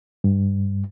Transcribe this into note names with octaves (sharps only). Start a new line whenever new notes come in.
G2